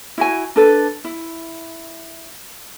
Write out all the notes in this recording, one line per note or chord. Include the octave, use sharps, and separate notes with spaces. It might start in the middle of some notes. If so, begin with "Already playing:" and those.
E4 F#4 G#5
D4 A4 B4
E4